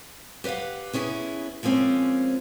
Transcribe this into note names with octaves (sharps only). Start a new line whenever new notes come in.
G4 B4 C5 F5 F#5
B3 C#4 E4 G#4
F3 G#3 A#3 C4 C#4